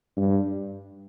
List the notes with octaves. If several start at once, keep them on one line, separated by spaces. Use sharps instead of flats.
G2